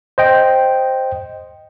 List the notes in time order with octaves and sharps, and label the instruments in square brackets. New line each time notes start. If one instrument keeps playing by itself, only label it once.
[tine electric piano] C5 D#5 G5